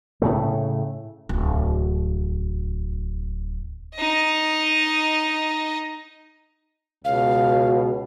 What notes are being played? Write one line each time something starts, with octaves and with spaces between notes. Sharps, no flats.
A2 C#3 A3
D1 C2
D#4 D#5
C#2 B2 F5